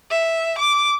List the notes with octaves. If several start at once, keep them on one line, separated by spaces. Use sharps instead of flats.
E5
D6